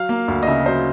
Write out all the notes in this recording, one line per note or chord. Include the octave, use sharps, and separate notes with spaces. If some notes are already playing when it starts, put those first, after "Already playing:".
Already playing: F#3 F5
A#3
D2
D#5
C#3 E5
F#3 C5